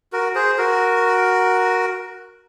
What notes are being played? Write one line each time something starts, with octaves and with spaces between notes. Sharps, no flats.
F#4 A#4
G#4 C5
F#4 A#4